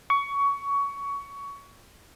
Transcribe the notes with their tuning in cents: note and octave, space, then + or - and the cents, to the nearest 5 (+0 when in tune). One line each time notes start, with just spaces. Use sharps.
C#6 +20